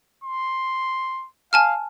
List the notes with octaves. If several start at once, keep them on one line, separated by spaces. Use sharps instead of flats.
C6
F5 G#5 A5 F6